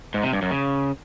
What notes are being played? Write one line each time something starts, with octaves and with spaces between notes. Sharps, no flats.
G#2
C3
G2
F#2
C#3